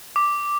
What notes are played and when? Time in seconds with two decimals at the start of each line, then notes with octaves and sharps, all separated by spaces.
0.16 D6